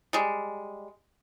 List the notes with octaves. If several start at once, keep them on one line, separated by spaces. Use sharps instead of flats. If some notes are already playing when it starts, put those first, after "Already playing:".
G3 G#3